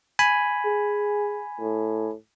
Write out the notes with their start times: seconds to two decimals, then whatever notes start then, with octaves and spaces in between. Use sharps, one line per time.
0.19 G#5 B5
0.66 G#4
1.61 A2